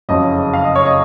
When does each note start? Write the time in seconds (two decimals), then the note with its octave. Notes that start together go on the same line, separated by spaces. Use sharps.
0.09 F#1 F2 C#3 F#3 D#5
0.53 F5
0.64 D#5
0.75 C#5
0.86 D#5